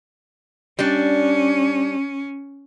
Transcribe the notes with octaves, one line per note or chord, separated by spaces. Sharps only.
G3 C#4 D4